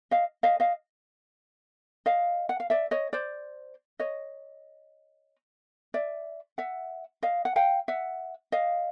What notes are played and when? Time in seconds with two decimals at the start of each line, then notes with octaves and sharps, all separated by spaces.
0.11 D#5 F5
0.43 D#5 F5
0.60 D#5 F5
2.06 D#5 F5
2.49 F#5
2.60 F5
2.70 D5 E5
2.91 C#5 D#5
3.13 C5 D5
3.99 C#5 D#5
5.94 D5 E5
6.58 E5 F#5
7.23 D#5 F5
7.45 F#5
7.56 F5 G5
7.88 E5 F#5
8.52 D#5 F5